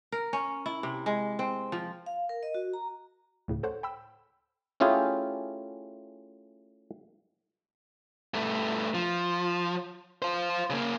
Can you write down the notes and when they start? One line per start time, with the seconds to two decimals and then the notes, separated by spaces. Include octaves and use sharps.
0.12 A#4
0.33 C#4
0.66 E4
0.83 C3
1.06 G#3
1.39 C4
1.72 F3
2.06 F5
2.29 A#4
2.43 D#5
2.55 F#4
2.73 A#5
3.48 D2 A2 C#3
3.63 A4 C5 C#5 F#5
3.83 G5 B5 E6
4.80 A3 C#4 E4 F4 G4 G#4
8.34 G2 A3
8.94 F3
10.22 F4 C5
10.70 C#3 A#3